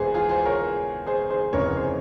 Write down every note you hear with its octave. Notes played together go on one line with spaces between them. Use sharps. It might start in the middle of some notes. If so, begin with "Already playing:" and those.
Already playing: E1 E2 E3 G#4 C5
F4 G#4
G#4 C5
A#4 C#5
G#4 C5
G#4 C5
F1 E2 C#3 E3 A#4 C#5
G#4 C5